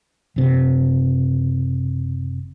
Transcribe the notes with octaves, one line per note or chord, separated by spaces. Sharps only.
F#1 C3